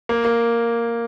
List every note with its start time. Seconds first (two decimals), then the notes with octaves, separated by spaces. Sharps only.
0.09 A#3
0.25 A#3